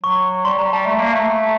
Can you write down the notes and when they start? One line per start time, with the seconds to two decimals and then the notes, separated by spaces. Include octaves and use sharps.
0.03 F#3 C#6
0.45 G3 C6
0.59 G3 A#5
0.73 G3 A5
0.87 A3
1.00 A#3
1.14 A3